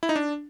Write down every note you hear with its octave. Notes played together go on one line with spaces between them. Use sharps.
E4
D#4
D4